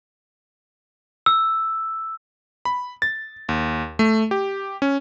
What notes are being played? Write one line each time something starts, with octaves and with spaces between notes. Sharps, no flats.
E6
B5
A6
D#2
A3
G4
C#4